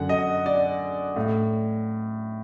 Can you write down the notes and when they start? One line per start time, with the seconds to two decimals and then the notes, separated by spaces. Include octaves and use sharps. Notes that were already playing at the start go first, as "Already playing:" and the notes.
Already playing: F#2 D3 F#5
0.09 D#5
0.46 D5
1.16 A2